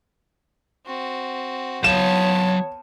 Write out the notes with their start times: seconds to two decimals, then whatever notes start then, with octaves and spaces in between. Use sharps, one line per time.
0.86 C4 F#4
1.84 F#3 B3 C#5 F5 A5 E7